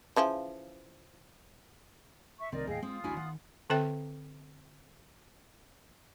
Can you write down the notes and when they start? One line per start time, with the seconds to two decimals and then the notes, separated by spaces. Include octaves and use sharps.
0.16 C#3 E3 F3
2.39 E5 C#6
2.52 C2 D#3 C4 A#4 D5 D#5
2.67 D#2 A2 G#4 D#5 F5 G5
2.83 G#3 C4 F4 D#6
3.04 A1 D2 D4 E4 F#4 G#5
3.17 D#3 F#5
3.70 D3 C4 A4 C5 E5 G5